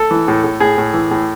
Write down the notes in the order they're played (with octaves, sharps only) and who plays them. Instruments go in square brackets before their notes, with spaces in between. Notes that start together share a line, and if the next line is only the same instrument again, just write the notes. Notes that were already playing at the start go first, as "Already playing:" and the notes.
Already playing: [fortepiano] A4
E3
A2
A2
A2 G#4
A2
E3
A2